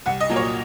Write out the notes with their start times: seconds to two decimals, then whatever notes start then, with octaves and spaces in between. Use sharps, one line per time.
0.06 C2 F#5
0.20 D#5
0.29 A#2 F#3 A#3
0.36 C#5